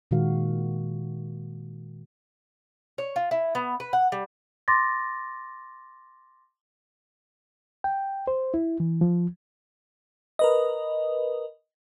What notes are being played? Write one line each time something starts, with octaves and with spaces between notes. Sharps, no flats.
A#2 D#3 G#3 F#4 F5
C#5
F4
E4
B3
B4
F#5
G3
C6 D6 A6 A#6
G5
C5
E4
E3
F3
A#4 B4 D#5